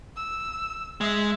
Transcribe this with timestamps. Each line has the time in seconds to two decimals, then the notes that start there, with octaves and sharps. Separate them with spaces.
0.16 E6
1.01 G#3 E5